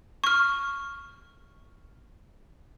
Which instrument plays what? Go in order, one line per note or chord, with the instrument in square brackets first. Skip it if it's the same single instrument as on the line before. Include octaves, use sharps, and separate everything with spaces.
[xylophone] C#6 F6